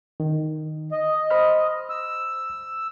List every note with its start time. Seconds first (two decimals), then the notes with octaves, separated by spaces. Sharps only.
0.20 D#3
0.92 D#5
1.30 C5 B5 F6
1.90 E6